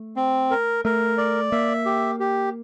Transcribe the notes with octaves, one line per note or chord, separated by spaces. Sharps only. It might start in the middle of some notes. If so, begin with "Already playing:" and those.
Already playing: A3
C4
A#4
A3 A#4
D5
A#3 E5
G4
G4